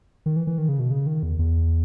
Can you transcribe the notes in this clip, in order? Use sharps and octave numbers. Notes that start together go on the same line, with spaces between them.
D#3
E3
E3
D#3
C#3
B2
C#3
D#3
E2
E2